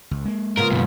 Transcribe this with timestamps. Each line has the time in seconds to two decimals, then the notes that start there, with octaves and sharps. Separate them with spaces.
0.11 C#2
0.25 G#3 A#3
0.57 C#3 B3 F4 A#4
0.71 F#2 B2